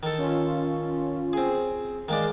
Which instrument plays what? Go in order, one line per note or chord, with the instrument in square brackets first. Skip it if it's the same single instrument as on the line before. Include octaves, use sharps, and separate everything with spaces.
[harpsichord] D#3 A4
[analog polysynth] C#4 F4
[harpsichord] C4 G#4
[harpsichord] D#3 G#3 D5 [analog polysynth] F5